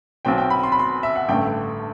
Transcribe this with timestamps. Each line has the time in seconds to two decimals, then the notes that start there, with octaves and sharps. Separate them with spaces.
0.25 B1 B2 F#3 C4 G5
0.38 G5
0.50 B5
0.63 C6
0.72 B5
0.79 C6
1.03 E5
1.15 F#5
1.28 A1 G2 D3 A3 G5